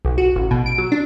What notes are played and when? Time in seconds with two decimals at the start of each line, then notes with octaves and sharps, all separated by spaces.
0.05 B1
0.18 F#4
0.36 A1
0.51 B2
0.66 D7
0.78 F#3
0.92 D4